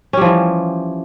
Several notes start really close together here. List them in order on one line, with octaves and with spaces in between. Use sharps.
C#4 G3 F3 E3